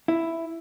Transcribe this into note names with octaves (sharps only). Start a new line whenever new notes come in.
E4